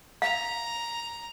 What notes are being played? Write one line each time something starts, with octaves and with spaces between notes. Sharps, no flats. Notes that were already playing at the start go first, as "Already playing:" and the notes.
F5 A#5